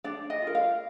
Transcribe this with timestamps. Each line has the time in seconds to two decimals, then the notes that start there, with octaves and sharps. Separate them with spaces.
0.04 D4 D5
0.30 D#5
0.42 F4
0.47 A#4
0.55 F5